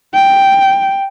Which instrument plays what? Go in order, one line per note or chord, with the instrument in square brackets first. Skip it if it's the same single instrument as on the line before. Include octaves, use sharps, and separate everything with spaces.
[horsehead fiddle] G5